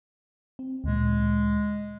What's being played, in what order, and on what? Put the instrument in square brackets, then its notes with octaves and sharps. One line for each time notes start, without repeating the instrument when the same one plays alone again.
[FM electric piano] C4
[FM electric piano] D2 A#2 [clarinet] G#3